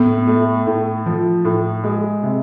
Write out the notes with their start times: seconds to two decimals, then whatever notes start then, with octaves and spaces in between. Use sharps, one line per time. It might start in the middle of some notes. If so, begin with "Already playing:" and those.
Already playing: A2 B3
0.27 A3
0.66 A2
1.06 F3
1.45 A2
1.84 G#3
2.23 C3